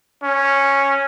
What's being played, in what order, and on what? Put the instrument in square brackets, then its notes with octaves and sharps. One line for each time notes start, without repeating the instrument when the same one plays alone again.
[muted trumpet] C#4